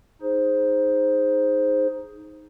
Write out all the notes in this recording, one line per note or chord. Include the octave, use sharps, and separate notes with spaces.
D#4 G#4 C5